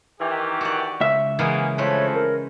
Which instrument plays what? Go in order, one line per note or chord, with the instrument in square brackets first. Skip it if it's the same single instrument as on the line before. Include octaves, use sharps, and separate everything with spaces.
[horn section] D#3 E3 G4
[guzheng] F#4 D5
[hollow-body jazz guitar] C#2 E5
[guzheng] C#3 E3 G#3 [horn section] A#3 B3 G#4
[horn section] F3 A3 C4 [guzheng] G#3 B4 [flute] C#5
[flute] A#4